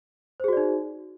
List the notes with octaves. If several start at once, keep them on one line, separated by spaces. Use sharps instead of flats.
D#4 F#4 G#4 C5 D5